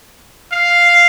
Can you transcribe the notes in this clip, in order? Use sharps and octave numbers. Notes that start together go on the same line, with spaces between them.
F5